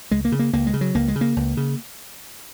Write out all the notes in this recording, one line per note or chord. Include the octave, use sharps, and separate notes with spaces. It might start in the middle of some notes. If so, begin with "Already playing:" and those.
C#2 G#3
A#3
C#3
A#3
C#2 A#3
G#3
C#3
F#3
C#2 A#3
G#3
C#3
A#3
C#2
C#3